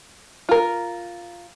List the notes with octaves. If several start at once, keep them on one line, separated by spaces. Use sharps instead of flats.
F4 A#4